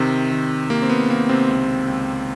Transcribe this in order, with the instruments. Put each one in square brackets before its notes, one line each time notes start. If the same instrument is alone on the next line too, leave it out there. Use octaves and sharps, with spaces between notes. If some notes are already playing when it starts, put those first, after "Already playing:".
Already playing: [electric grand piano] C3 D#3 C4
D#3
C3 A#3
C4
B3
D#3 A#3
C3 C4
C#2
C#2